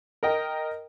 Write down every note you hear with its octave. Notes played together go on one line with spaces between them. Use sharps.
A#4 D#5 G5